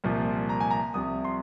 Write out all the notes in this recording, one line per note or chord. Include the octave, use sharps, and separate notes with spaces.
C2 A#2 F3
A#5
G#5
A#5
C2 C3 F3 D#6
C6